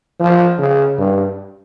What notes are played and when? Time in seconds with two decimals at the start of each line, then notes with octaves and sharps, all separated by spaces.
0.19 F3
0.58 C#3
0.98 G2